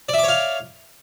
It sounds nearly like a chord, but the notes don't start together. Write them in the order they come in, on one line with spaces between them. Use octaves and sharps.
D5 E5 D6 C#5 F5